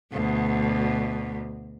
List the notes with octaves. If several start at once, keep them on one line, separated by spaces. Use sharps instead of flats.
D2 B2